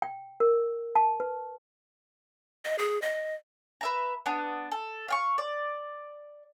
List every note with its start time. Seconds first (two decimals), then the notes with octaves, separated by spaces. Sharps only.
0.02 G5
0.40 A#4
0.95 A5
1.20 B4
2.65 D#5
2.79 G#4
3.02 D#5
3.81 B4 E5 A#5
4.26 B3 D4
4.71 A4
5.08 F5 G5 C#6
5.38 D5